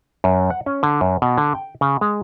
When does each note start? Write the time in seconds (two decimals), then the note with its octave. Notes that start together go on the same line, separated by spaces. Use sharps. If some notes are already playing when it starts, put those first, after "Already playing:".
0.24 F#2
0.50 F#5
0.66 C#4
0.83 D3
1.01 F#2
1.22 B2
1.38 D3
1.55 G5
1.81 C#3
2.01 G#3